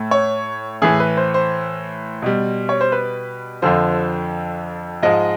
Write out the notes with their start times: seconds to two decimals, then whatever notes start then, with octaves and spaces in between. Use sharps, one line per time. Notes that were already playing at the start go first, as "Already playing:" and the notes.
Already playing: A2 A3
0.11 C#5
0.82 A2 E3 A3 G#4
1.00 B4
1.17 C5
1.34 C5
2.22 B2 G3
2.69 C#5
2.81 C5
2.92 B4
3.62 F2 D3 F3 C5
5.03 G#2 F3 G#3 D#5